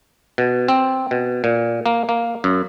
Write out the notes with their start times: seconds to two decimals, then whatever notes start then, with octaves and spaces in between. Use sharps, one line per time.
0.38 B2
0.68 C4
1.11 B2
1.44 A#2
1.86 A#3
2.09 A#3
2.44 F#2